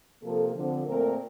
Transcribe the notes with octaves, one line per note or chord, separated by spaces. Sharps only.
C3 F3 A#3 A4
D3 F3 C4
A#2 A3 C4 A#4